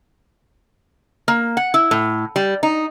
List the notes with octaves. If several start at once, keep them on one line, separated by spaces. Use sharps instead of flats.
A#3
F#5
E4
A2
G3
D#4